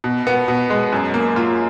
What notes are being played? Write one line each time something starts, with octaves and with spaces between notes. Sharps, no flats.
B2
B3
B2
G#3
F#2
A#3
F4